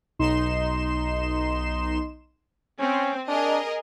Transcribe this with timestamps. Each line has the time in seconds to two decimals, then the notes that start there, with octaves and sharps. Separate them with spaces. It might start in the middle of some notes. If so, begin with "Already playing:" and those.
0.19 B1 D#4 C6 E7
2.80 C4 C#4
3.28 D4 G#4 A#4 D#5